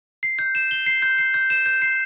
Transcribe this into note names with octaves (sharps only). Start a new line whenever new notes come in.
C7
G6
E7
G7
C7
G6
C7
G6
E7
G6
C7